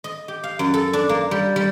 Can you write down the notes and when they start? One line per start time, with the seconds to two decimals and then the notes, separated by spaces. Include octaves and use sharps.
0.04 D#5
0.28 G4
0.44 F5
0.59 F#2
0.74 A4
0.93 D4
1.09 A#3
1.31 G3
1.56 G3